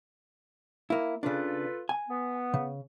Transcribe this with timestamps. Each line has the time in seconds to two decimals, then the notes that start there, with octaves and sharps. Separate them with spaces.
0.90 A#3 E4
1.23 C#3 D4 F4 A4 B4
1.89 G#5
2.09 B3
2.54 C#3